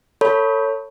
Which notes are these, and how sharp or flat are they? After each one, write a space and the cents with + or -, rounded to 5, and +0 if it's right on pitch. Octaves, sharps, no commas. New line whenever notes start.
A4 +30 C#5 +0 B5 +0